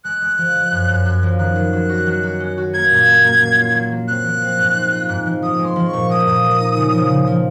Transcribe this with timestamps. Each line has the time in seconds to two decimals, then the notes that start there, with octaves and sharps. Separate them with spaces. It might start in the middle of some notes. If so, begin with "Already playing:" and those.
0.04 G#3 F#6
0.22 G#3
0.38 F3
0.55 F3
0.71 F#2
0.89 F#2
1.06 F#2
1.23 F3
1.39 D#3 F#6
1.56 F#3
1.73 F#3
1.89 F#4
2.07 F#3
2.23 F#4
2.40 C#4
2.57 F#4
2.73 A#3 G#6
2.91 A#2
3.07 A#3
3.24 A#3
3.41 F#3
3.58 F4
3.75 F#3
3.92 F#3
4.08 C4 F#6
4.24 F3
4.42 C4
4.59 G#2
4.75 C4
4.92 F4
5.09 G#2
5.26 F3
5.42 F3 D#6
5.59 G#3
5.65 C6
5.76 F3
5.88 C#6
5.93 A#2
6.09 G#3 D#6
6.27 A#2
6.43 F3
6.60 D#4
6.77 C#3
6.94 F3
7.10 C#3
7.27 F3